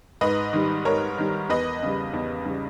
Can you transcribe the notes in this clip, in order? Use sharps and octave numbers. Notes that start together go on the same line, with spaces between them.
G#2 B4 D#5
D#3 G3
G#2 A#4 C#5
D#3 G3
E2 B4 D#5
C#3 G3
E2
C#3 G3